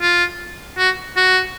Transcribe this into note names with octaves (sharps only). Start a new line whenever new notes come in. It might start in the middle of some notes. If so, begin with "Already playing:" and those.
F4
F#4
F#4